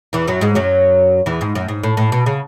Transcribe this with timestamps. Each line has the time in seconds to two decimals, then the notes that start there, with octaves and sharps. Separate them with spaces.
0.13 E2 E3
0.28 F#2 F#3
0.41 G#2 G#3
0.55 F#2 F#3
1.26 E2 E3
1.41 G#2
1.55 F#2
1.68 G#2
1.83 A2
1.97 A2
2.12 B2
2.26 C#3